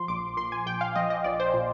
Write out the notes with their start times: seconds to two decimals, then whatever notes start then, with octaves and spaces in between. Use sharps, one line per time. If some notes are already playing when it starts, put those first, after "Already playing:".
Already playing: F3 C6
0.08 A#1 D6
0.37 A#2 C6
0.52 G#5
0.66 A#1 G5
0.81 F5
0.95 F3 D#5
1.10 D#5
1.24 A#1 D5
1.40 C5
1.54 A#2